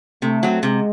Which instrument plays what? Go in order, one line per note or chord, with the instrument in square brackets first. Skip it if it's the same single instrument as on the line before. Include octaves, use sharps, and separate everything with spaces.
[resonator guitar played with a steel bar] C3 [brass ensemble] A3
[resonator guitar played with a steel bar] F#3 C4
[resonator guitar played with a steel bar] C3 [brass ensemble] G#3